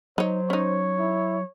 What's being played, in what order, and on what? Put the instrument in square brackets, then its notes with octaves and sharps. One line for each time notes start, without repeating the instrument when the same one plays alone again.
[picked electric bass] F#3 [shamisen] D#4 C#5 [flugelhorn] C5
[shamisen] C#4 D#4 [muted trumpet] C#5
[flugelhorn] E4